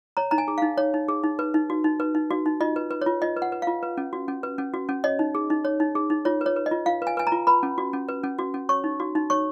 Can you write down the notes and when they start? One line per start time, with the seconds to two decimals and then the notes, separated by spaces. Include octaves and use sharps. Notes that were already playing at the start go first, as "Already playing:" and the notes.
0.17 C#5 A#5
0.31 D#4 A#5
0.38 G#5
0.48 G#4
0.58 D#4 F5
0.78 C#5
0.94 D#4
1.09 G#4
1.24 D#4
1.39 B4
1.54 D#4
1.70 F#4
1.84 D#4
2.00 B4
2.15 D#4
2.31 F#4
2.46 D#4
2.61 F4 D#5
2.76 B4
2.91 B4
3.02 F4 C#5
3.22 F4 D#5
3.37 B4
3.42 F#5
3.52 B4
3.62 F4 F5
3.83 B4
3.97 C#4
4.13 F#4
4.28 C#4
4.43 B4
4.58 C#4
4.74 F#4
4.89 C#4
5.04 C#5 D#5
5.19 D#4
5.35 G#4
5.50 D#4
5.65 C#5
5.80 D#4
5.95 G#4
6.10 D#4
6.25 F4 C#5
6.41 B4
6.46 C#5
6.56 B4
6.66 D#5
6.71 F4
6.86 F4 F5
7.02 B4 G#5
7.17 B4 G#5
7.27 A#5
7.32 F4
7.47 B4 B5
7.63 C#4
7.78 F#4
7.93 C#4
8.08 B4
8.24 C#4
8.39 F#4
8.54 C#4
8.69 C#5 C#6
8.84 D#4
9.00 F#4
9.15 D#4
9.30 C#5 C#6